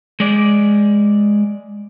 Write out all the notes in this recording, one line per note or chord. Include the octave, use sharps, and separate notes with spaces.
G#3 D5